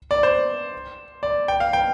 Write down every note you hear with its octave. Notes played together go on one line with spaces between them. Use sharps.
D5
C5
D5
G5
F5
G5